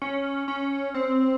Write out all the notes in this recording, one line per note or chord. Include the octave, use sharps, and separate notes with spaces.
C#4
C#4
C4